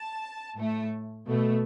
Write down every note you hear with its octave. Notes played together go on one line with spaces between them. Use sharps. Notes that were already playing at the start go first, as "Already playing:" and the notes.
Already playing: A5
A2 A3
B2 A3